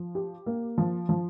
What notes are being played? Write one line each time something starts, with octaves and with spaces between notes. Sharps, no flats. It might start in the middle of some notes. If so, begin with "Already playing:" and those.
Already playing: F3
G4
A#3
F3
F3